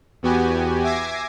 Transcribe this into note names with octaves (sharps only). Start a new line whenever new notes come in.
E2 B3 F#4 G4 G#5
E5 G#5 D6 G#6 A#6 C7